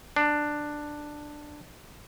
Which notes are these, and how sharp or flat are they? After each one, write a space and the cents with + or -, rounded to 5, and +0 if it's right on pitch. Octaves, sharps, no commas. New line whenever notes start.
D4 +10